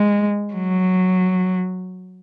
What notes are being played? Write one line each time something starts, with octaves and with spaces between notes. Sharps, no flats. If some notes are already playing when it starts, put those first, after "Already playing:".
Already playing: G#3
F#3